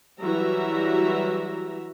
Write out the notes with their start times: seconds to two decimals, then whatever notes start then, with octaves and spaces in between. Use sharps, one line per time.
0.21 E3 F#3 G3 F#4 E5 A#5